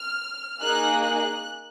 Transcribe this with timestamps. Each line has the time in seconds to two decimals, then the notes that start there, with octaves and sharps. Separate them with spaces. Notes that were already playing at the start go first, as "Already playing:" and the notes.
Already playing: F6
0.60 A#3 D#4 G#4 F#6
1.02 F#6